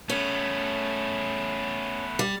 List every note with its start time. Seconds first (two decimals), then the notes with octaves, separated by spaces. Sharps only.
0.10 A3 B3 C#4
2.19 G3